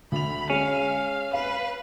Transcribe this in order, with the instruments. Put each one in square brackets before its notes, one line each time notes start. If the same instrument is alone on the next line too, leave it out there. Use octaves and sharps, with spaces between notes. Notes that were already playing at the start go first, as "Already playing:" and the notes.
[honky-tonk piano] D2 F7 [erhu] B5
[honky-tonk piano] G#3 [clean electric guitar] C#4 [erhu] F5
[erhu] B4 [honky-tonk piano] F5